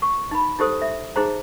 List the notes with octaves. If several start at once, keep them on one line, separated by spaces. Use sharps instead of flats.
C#6
D#4 B5
D#4 G4 A4 C5 D#6
E5
D#4 G#4 C5 A#5